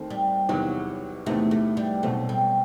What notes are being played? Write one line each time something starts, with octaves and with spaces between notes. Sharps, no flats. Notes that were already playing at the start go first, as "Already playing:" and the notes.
Already playing: D#2 D#3 A3 C4
G3
E2 C3 D#3 F#3
E2 C3 D#3 A3
A3
G3
B1 B2 F#3 A3 C4
G3